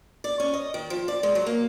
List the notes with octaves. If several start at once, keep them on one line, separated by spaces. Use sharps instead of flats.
D5
C#4
D#5
D#3
F3
D5
G#3
F#3
A#3